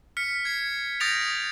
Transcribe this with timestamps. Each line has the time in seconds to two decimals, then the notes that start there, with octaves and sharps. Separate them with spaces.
0.17 F6 B6 C#7
0.45 G#6 C7
1.00 D#6 G6 A6 A#6 D7 F7